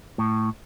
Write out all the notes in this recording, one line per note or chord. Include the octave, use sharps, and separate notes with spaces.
A2